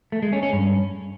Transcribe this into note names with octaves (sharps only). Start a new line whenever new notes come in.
A3
G#3
C#4
C#4
G2